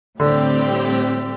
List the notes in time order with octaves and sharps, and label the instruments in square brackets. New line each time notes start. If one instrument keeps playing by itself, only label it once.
[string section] A2 G3 C4 G4 [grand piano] D3